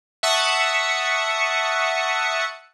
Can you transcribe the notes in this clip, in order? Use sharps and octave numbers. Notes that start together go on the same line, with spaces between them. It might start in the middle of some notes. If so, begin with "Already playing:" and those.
E5 F#5 A5 C#6 D#6 C#7